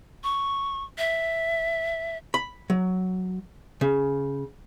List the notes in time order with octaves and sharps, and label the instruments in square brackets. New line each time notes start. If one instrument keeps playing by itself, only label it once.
[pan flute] C#6
E5
[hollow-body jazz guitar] B5
F#3
C#3